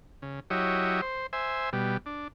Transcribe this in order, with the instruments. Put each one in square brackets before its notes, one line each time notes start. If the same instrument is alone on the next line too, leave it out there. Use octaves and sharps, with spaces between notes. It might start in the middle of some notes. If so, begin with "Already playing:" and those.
[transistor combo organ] C#3
F#3 E4 G4 C#5 D#5
C5
C5 E5 G#5
B2 G3
D4